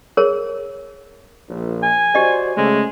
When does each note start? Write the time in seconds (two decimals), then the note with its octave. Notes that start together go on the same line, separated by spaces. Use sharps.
0.17 G#4 A#4 C#5
1.49 A#1
1.83 G#5
2.15 F#4 G4 C5 D5 D#5
2.57 C#3 G#3 A3